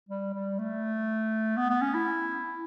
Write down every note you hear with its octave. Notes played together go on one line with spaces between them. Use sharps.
G3
G3
A3
B3
B3
C#4
E4